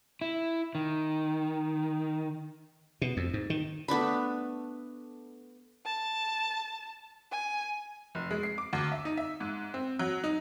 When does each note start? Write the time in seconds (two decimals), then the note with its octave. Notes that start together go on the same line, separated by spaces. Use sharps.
0.21 E4
0.75 D#3
3.01 B2
3.17 F2
3.34 G#2
3.50 D#3
3.88 A3 B3 D4 B5
5.86 A5
7.31 G#5
8.15 F1
8.31 G#3
8.43 C7
8.58 D6
8.73 D2
8.92 E5
9.05 D#4
9.17 E5
9.40 G#2
9.74 C4
9.99 F#3
10.24 D#4